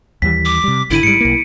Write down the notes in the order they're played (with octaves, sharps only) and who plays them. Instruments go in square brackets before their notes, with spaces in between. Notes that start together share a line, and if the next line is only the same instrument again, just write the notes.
[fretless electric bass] D#2 E3 G3 [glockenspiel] B6
[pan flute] D6
[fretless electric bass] C3 G3
[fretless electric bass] G#1 D3 [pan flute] E4 [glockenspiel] D7 D#7
[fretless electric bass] G#2 G3 [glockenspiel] C#7 D7
[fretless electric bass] B1 A#3